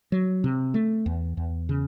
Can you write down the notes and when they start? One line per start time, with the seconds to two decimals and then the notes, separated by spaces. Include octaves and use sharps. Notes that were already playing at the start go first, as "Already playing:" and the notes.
0.12 F#3
0.44 C3
0.74 A3
1.06 E2
1.37 E2
1.69 C#3